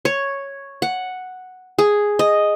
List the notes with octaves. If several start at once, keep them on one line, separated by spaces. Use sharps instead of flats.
C#5
F#5
G#4
D#5